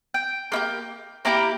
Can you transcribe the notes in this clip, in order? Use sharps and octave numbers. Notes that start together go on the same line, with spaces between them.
G5
A#3 E4 G4
A#3 E4 G4 A#5